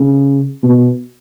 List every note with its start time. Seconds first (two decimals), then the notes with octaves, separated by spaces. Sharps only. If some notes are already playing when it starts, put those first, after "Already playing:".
Already playing: C#3
0.63 B2